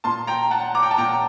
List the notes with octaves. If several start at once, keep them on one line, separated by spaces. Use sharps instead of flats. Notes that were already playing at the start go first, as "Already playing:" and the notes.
A#2 A5 C6
G5 A#5
F#5 A5
A#5 D6
G5
A5
A#2 G5 A#5